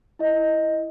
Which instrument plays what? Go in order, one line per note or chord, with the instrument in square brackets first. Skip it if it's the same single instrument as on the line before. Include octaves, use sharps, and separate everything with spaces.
[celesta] E4 D#5